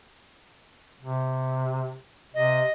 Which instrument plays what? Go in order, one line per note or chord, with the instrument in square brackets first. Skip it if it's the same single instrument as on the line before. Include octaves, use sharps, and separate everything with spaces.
[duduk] C3
[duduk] C3 [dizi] D#5